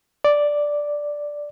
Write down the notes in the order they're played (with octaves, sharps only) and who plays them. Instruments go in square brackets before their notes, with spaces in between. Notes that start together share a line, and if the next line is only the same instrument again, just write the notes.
[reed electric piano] D5